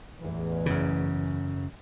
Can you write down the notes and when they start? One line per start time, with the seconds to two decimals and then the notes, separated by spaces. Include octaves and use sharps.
0.21 A1 E2 E3
0.66 F#2 C#3